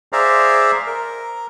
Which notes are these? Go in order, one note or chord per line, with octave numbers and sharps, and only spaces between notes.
G#4 C5 D5 E5 F5 A#5
A#4